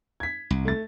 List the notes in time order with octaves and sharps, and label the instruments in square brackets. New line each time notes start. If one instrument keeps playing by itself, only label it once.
[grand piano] G#6 B6
[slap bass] C2
[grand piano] A3 A6